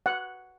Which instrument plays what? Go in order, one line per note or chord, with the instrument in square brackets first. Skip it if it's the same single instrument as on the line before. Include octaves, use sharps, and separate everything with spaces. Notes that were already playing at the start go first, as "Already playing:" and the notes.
[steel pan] F#5